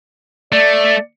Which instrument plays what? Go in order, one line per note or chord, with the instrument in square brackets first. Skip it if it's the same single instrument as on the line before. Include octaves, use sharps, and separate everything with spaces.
[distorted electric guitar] A3 [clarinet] D5